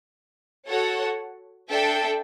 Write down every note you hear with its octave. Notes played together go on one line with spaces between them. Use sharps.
F#4 A4 C#5 F#5
D4 A4 E5 G5